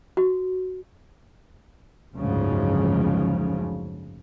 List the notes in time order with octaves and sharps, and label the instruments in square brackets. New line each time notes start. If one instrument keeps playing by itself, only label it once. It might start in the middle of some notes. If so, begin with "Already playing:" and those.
[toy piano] F#4
[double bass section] F#1 D2 G#2 C#3 F3